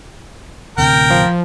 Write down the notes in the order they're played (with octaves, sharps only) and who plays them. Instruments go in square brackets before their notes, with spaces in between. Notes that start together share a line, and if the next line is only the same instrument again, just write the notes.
[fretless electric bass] D1 D2 C3 [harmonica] A#4 G5
[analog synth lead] F3